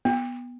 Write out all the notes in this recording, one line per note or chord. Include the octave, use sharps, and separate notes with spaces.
B3